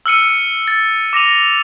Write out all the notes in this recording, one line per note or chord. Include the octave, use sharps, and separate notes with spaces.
E6 F6 C#7 D#7
A6
D6 A#6 D#7 F7